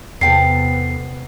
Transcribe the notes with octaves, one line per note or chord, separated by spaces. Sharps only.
E2 C3 B3 A4 G5 A5 C7